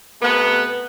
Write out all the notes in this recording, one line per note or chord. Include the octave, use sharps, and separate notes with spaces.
C3 A3 B3